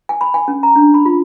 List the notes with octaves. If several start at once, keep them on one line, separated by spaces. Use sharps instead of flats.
G#5
B5
G#5
C#4
A#5
D4
B5
F4